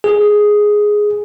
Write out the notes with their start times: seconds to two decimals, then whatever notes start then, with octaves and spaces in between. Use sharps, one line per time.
0.04 G#4